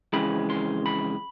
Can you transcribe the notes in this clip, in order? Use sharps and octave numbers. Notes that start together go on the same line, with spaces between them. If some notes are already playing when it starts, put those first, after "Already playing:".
F2 C#3 E3 G#3 B5
C6
B5